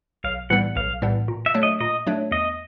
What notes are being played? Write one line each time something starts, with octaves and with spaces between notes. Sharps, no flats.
B1 F5
A2 E3 G3 B3 F#5
B1 F5
A2 E3 G3 B3
A#2
E5
F#3 A3 D4
D#5
A#2 D#5
F#3 A3 D4
E2 D#5